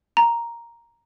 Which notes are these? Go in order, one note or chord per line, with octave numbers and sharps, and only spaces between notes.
A#5